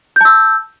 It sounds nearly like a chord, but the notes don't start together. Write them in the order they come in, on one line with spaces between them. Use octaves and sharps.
G6 A5 E6